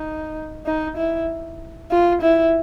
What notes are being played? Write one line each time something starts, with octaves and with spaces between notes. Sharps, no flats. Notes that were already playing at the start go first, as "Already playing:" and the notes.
Already playing: D#4
D#4
E4
F4
E4